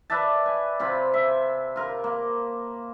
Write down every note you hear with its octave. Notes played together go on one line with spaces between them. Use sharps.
B4 D5 E5 A5
G#5
C3 F4 B5
E5
F4 A#4
A#3